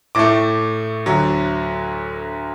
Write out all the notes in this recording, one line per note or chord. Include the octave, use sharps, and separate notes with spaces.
A2 A3 D6
D2 D3 F#3